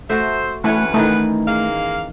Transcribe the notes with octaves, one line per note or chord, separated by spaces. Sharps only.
A3 F#4 C5 E5
D2 E3 A3 C#4 B4 C#5 F#5
D#3 E3 A3 D#4
G#3 A#3 F5